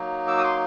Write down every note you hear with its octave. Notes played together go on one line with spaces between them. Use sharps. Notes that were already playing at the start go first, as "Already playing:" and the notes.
Already playing: F#3 A#3 D#4
D6 E6
D#6
C6 D6